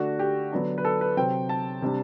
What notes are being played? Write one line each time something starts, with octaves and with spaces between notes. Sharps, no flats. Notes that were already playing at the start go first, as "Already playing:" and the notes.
Already playing: D3 A3 D4 F#4
G4
D3 F#3 B3 D4
B4
A4
B4
C3 F#3 C4 G5
A5
C3 G3 D4